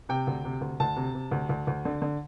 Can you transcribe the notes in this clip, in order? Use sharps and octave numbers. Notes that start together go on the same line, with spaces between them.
C3 G5
D2
C3
D2
D2 A5
C3
C3
D2
D2
D2
D3
D3